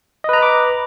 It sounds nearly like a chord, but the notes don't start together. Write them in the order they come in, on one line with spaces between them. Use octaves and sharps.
D#5 B4 A#5 B5 D6